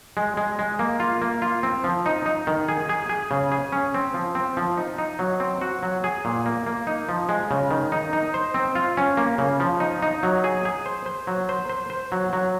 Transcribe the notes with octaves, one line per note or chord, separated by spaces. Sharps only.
G#3
G#3
G#3
A#3
F4
A#3
F4
C4
F3
D#4
D#4
D#3
G#4
G#4
G#4
C#3
G#4
C#4
C4
F3
C4
F3
D#4
D#4
F#3
C4
F#4
F#3
G#4
A#2
A#3
A#3
D#4
F3
G#3
C#3
D#3
D#4
D#4
C5
C4
F4
C#4
A#3
C#3
F3
D#4
D#4
F#3
G#4
G#4
C5
C5
F#3
C5
C5
C5
F#3
F#3